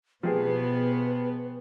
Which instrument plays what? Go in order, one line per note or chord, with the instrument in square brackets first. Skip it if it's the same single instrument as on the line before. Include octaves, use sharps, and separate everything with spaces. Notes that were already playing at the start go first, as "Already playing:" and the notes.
[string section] B2 B3 [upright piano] F3 G4 G#4 [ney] B4